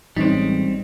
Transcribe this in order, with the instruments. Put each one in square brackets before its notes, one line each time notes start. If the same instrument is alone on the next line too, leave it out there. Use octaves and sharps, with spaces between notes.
[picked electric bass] A1 G#3 [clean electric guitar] G3 C4 [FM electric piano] C#4 D#4